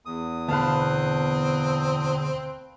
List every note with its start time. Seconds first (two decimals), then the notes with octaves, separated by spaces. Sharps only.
0.06 E2 D#6
0.48 D2 B2 C4 B4 F5 A5